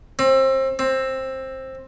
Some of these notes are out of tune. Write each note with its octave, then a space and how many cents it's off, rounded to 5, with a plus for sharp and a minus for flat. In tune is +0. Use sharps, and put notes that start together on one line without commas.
C4 +30
C4 +15